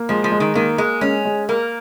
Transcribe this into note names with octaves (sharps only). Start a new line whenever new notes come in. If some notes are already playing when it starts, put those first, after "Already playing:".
Already playing: A#3
F3 G#3
F3
G#3
D#3
D#3 A#3
G#3 A#3
G#3 C#4
G#3
A#3 A#4